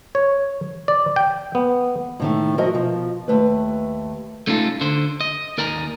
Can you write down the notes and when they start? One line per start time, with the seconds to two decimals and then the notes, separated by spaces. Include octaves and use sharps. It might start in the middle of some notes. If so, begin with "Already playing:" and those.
0.15 C#5
0.88 D5
1.16 G5
1.55 B3
2.20 A2 D#3 A3
2.58 F3 F#4 A#4 D#5 E5
2.73 B2 F3
3.28 D#2 A3 B4
4.47 A3 C#4 D#4 F4 A4
4.81 D3 C5
5.21 D#5
5.58 D#2 A#4 D5 D#5 G#5 A#5